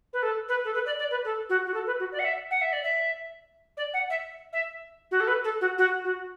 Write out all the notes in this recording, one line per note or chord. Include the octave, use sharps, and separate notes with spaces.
B4
A4
B4
A4
B4
D5
D5
B4
A4
F#4
F#4
A4
B4
F#4
D5
F#5
E5
F#5
E5
D5
E5
D5
F#5
E5
E5
F#4
A4
B4
A4
F#4
F#4
F#4